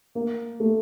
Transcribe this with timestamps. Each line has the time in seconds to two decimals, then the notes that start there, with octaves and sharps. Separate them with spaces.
0.15 A#3
0.60 A3